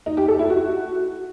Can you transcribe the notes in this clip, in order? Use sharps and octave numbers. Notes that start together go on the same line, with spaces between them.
D#4
G4
A4
E4
F#4